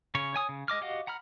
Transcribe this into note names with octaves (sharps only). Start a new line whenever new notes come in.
C#3 C#4 C#5
C#5 G#5 D#6
C#3
G#3 D#5 D6 F6
F#4 G4 D#5 F5 F#5
F#5 A#5 B5 F6